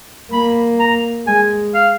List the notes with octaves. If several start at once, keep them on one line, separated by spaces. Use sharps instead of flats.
A#3 B5
A#5
G#3 G#5
F5